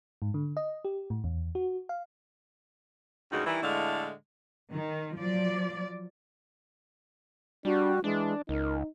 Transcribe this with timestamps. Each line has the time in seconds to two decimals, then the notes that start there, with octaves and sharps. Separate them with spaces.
0.22 G#2
0.34 D3
0.57 D#5
0.85 G4
1.10 A2
1.24 E2
1.55 F#4
1.89 F5
3.31 D2 G2 C#3 G#3 D#4 F#4
3.46 D#3 E3 G3 E4
3.63 A2 D3 G#3 A3 E4 F5
4.72 D#3
5.17 F3 F#3 D5
7.65 G3 D4 F#4
8.04 E3 G#3 D4
8.49 C#2 D#4 A#4